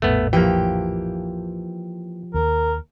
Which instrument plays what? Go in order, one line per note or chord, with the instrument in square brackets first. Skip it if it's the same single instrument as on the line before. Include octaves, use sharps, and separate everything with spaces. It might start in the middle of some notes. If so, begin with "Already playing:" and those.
[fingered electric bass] A#1 F2 A2 [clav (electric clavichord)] A3 B3
[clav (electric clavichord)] E3 A#3 [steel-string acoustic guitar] F3 G4 G5
[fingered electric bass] D#2 [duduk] A#4